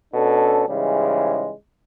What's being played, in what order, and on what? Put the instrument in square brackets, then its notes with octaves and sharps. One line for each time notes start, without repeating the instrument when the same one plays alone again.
[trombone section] B2 C#4 D4 A4
G#2 C#3 E3 G3 G#3